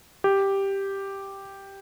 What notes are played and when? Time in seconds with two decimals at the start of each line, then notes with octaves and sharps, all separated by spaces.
0.24 G4